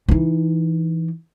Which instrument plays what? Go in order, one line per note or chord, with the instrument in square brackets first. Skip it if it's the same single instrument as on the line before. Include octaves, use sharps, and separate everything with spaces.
[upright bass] E3 D#4